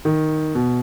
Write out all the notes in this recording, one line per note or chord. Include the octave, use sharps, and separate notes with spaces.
D#3
B2